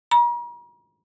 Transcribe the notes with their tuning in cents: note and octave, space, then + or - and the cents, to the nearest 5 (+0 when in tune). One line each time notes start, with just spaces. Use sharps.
A#5 +45